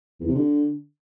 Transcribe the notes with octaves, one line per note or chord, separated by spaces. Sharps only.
E2
C3
D3